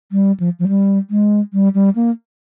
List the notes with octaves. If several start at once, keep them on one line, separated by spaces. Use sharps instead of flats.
G3
F3
F3
G3
G#3
G3
G3
A#3